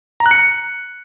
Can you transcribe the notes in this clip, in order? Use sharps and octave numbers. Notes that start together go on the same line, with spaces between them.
A#5
F#6
C#7